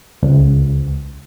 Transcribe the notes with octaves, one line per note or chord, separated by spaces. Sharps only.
C#2